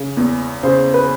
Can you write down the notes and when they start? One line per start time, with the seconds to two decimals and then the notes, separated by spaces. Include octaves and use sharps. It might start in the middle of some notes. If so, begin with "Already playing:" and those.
Already playing: C#3
0.17 E2
0.63 C#3 C5
0.94 B4